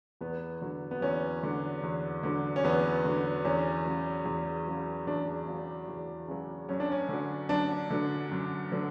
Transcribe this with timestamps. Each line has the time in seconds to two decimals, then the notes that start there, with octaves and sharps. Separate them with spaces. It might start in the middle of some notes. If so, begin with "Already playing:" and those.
0.21 E2 B3
0.62 D3 F#3
0.91 B3
1.02 E2 C#4
1.43 D3 F#3
1.83 E2
2.23 D3 F#3
2.56 C#4
2.64 E2 B3
3.05 D3 F#3
3.45 E2 C#4
3.85 C#3 F#3
4.25 E2
4.67 C#3 F#3
5.07 E2 D4
5.48 C#3 F#3
5.88 E2
6.28 C#3 F#3
6.69 F#2 C#4
6.80 D4
6.92 C#4
7.09 D3 F#3
7.49 F#2 D4
7.90 D3 F#3
8.31 F#2
8.72 D3 F#3